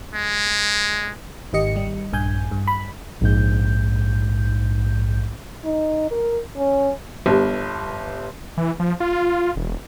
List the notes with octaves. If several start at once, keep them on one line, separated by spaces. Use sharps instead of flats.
G#3
G#1 D#3 G4 D#5 C#7
G3
A#1 G2 G#5 G6
G2
B5
A#1 G#2 G6
D#4
A#4
C#4
G1 G2
E3
F3
F4
E1